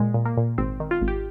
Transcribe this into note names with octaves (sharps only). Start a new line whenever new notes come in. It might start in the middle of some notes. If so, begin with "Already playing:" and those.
Already playing: A#2 G#3
A#2
A#3
A#2
G#1 C4
D#3
F4
G#1
G4